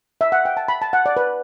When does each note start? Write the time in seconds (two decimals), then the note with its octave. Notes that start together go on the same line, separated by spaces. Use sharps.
0.21 E5
0.32 F#5
0.45 G5
0.57 A5
0.68 B5
0.82 A5
0.93 F#5
1.06 D5
1.17 B4